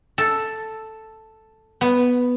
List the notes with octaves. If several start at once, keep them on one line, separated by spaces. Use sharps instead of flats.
A4
B3